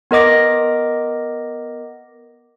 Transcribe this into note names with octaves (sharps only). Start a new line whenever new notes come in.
B3 A#4 D#5 D6 A#6